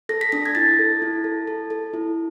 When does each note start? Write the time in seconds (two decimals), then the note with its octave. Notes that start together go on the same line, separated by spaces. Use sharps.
0.09 A4 A#6
0.21 B6
0.32 D4 A#6
0.46 G#6
0.55 E4 A6
0.79 A4
1.02 E4
1.24 A4
1.47 A4
1.70 A4
1.93 E4